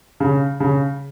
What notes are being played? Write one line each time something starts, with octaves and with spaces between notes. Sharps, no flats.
C#3
C#3